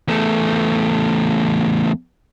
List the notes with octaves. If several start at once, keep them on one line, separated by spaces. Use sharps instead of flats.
E2 A3